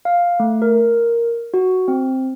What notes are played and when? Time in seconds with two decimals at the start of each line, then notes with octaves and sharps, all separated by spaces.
0.05 F5
0.40 A3
0.62 A#4
1.54 F#4
1.88 C4